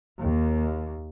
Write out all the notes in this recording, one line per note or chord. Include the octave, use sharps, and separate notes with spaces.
D#2